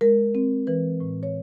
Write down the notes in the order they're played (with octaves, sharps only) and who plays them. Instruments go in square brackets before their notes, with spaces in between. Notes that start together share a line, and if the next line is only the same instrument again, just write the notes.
[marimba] G#3 A#4
C4
E3 B4
A2
C#5